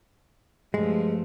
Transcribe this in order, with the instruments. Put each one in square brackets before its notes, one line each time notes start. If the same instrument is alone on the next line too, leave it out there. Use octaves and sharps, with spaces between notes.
[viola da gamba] G2 F3 A3 [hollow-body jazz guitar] G#3